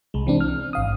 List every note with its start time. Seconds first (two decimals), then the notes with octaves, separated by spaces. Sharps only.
0.14 C2 G#3
0.27 E3 C4 D4
0.41 F6
0.73 G#1 F5 D#6